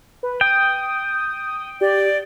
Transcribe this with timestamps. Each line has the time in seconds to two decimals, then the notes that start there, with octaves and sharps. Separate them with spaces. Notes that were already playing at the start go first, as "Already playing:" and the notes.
0.23 B4
0.41 G5 D#6
1.81 G4 D5